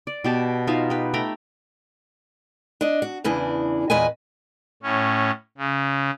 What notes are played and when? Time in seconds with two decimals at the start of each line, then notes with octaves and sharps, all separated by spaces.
0.07 D5
0.24 B2 G4 A5
0.67 D#4 F4 E5 F5
0.90 G4 B4
1.14 A3 G5 A#5 B5
2.81 D4 D#5
3.02 F#4
3.24 E2 C#3 E3 D4
3.90 E2 A#2 B4 D#5 G#5
4.83 A2 C#4
5.58 C#3